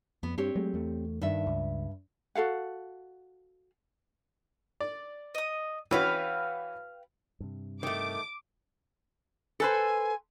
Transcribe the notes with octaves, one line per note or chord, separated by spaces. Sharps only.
F2 B3
G2 C4 G4 C#5
F#3 G#3 A3
E2 A3
G2 D#3 E5
C#2
F#4 A4 F5 F#5
D5
D#5 D#6
E3 C#4 F#4 B4 F5 G5
G2 C3
D#3 A3 D6
A4 B4 C5 G#5